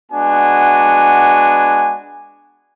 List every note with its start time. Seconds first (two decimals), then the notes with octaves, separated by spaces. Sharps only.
0.12 G#3 B3 D4 F#4 G#5